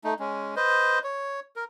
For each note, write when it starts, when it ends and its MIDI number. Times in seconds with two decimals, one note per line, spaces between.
0.04 0.14 57
0.04 0.14 63
0.19 0.55 56
0.19 0.55 61
0.56 0.99 71
0.56 0.99 72
0.56 0.99 75
1.04 1.40 73
1.56 1.64 70